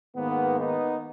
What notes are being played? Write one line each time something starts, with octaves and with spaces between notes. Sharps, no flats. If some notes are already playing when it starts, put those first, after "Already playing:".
G#2 D#3 A#3 B3
B3 D#4